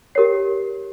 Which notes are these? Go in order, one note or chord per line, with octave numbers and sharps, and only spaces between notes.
G4 A#4 C#5 C7